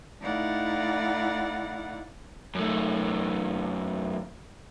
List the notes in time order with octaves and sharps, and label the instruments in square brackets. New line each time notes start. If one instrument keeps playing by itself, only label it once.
[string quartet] A3 D#4 E4 D5 F5 F#5
[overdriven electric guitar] F#2 A3